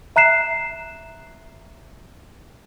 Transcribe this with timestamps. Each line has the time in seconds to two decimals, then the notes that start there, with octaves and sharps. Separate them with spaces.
0.16 E5 A#5 F#6 C7 E7